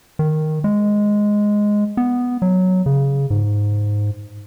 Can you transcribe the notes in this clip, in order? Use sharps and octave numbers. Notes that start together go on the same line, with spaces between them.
D#3
G#3
B3
F#3
C#3
G#2